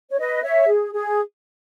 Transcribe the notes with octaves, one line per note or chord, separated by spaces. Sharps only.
C#5
B4 D#5
C#5 E5
G#4
G#4